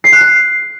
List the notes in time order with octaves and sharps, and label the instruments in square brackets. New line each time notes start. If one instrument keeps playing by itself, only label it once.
[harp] C7
F#6
C7